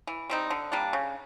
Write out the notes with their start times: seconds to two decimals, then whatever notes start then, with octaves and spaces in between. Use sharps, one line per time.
0.07 E3
0.30 G3 C4 D#4
0.50 D3
0.72 G3 A#3 D4
0.93 C#3